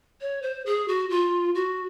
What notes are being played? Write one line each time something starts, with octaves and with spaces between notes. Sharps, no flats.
C#5
C5
G#4
F#4
F4
F#4